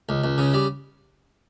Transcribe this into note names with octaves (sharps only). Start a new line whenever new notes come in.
C#2
C#2
C#3
G3